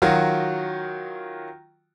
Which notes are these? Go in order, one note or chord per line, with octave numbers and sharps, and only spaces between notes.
D#3 F#3 F4 F#4